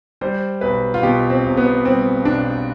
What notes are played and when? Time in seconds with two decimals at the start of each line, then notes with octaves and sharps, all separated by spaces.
0.21 G3 C5
0.61 B1 B4
0.94 F4
1.03 B2 G4
1.30 C4
1.44 B1
1.57 B3
1.85 G3 C4
2.25 B1 D4